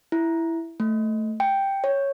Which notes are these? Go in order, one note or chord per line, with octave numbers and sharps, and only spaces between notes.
E4
A3
G5
C#5